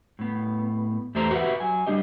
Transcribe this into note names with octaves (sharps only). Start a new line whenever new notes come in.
A2 B3
E2 A3 G4 C5 A#5
F#4 G4 B4 C5 E5 F#5
F#3 G#5
G3 D4 G4 D#5